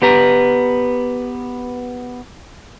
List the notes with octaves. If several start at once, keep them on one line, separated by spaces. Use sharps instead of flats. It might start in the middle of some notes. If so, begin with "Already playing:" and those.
B3 G4 B4 A#5